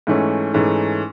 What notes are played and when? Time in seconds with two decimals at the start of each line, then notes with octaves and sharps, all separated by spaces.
0.07 G#2 E3 A3 C#4
0.53 G#2 E3 A3 C#4